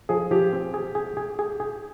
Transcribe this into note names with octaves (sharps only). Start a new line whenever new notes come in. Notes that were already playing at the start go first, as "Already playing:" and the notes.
F3 G#4
F3 G4
C4
G#4
G#4
G#4
G#4
G#4